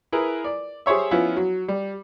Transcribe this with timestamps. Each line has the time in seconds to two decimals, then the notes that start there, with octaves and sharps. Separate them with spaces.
0.12 E4 G#4 A#4 B4
0.44 D5
0.86 G4 G#4 C5 C#5 E5
1.11 F3 B3 C#4 E4 F4
1.36 F#3
1.68 G3